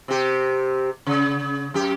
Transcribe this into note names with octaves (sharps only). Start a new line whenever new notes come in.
C3 G4
C#3
F#2 G4